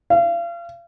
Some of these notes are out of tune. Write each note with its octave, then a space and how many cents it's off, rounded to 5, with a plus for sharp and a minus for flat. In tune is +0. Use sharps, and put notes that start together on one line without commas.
F5 -35